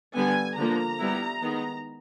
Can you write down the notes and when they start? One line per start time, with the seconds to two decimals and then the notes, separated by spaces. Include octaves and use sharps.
0.15 D3 G3 B3 G#5
0.57 D3 F3 A#3 A#5
0.99 G3 B3 E4
1.42 D#3 G#3 B3